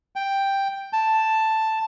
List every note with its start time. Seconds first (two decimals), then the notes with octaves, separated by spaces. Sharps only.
0.16 G5
0.93 A5